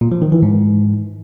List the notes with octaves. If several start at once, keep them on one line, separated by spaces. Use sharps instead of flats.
A#2
F3
D#3
E3
G#2